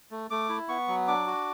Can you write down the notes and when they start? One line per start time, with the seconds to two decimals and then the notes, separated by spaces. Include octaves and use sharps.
0.11 A3
0.30 A3 D6
0.49 E4
0.69 B3 C#6
0.88 F#3
1.08 D4 D6
1.27 F#4